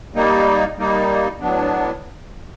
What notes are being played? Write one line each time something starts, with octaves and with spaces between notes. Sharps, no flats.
G3 A#3 D#4
G3 A#3 D#4
A2 F#3 B3 D4